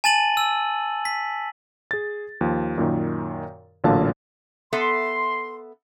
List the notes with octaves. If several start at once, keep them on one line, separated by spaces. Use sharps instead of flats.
G#5 A5 A6 D#7 F#7
E6
B6
G#4 A6
D#2 F3
F#2 A#2 D#3
A1 A#2 D3 F#3 F5 A5
B3 A4 E5 C6